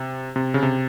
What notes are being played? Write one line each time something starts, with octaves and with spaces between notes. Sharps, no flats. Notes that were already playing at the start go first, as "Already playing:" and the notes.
Already playing: C3
C3
C#3
C3